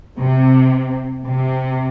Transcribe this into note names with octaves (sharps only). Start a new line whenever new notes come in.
C3
C3